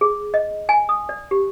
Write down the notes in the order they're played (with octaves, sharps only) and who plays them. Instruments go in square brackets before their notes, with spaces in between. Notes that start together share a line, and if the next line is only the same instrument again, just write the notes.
[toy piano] G#4
D#5
G#5
D#6
D5
G4